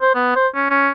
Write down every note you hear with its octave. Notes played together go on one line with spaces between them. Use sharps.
C5
B3
C5
C#4
C#4